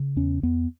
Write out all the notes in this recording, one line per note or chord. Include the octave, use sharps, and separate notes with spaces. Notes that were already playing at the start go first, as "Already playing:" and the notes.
Already playing: C#3
E2 C#4
E2 B3